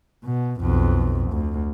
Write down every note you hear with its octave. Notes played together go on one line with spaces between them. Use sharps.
B2
B1 F2
D2